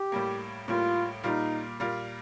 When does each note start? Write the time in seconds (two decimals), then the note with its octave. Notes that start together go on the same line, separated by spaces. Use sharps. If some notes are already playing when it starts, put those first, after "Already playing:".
Already playing: G4
0.12 A2 G3 A#3
0.68 A2 G3 A#3 F4
1.24 A#2 G3 A#3 D#4 F4
1.80 A#2 G3 A#3 F4